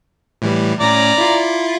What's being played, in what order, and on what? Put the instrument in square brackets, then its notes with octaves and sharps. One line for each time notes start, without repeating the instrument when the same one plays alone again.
[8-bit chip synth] A2 E3 G3
[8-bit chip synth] A2 C#4 [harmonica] D5 A#5
[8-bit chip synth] E4 F4